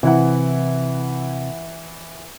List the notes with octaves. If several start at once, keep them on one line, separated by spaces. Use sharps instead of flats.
C3 E3 E4 F#5